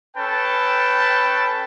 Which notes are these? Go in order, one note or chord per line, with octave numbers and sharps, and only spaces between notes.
C#4 A4 B4 G5 A5